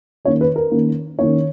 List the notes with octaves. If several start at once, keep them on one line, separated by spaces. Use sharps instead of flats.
D#3 A#3 C#4 C#5
B4
A#4
D#3 A#3 C#4
D#3 A#3 C#4 C#5